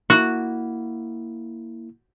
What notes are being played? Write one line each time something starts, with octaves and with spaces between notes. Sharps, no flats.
A#3 E4 F#4